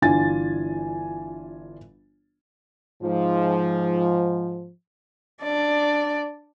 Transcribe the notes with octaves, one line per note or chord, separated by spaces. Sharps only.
G1 E3 D4 F4 G#5 A6
G#2 F3
D4 D5